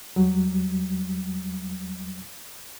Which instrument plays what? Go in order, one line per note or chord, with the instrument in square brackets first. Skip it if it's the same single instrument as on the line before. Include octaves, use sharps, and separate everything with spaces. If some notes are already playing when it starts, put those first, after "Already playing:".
[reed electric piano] E2 F#3 G3